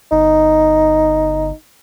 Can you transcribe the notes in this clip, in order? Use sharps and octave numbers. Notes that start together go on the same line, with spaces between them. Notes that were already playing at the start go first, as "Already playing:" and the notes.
G1 D#4